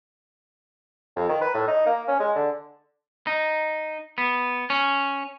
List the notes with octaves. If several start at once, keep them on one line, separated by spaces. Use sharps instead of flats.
F2
D#3
B4
A2
D#4
A#3
C#4
G#3
D3
D#4
B3
C#4